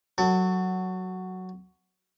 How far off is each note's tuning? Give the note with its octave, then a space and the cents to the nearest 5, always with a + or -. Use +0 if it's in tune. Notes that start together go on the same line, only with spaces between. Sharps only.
F#3 +5 A4 +35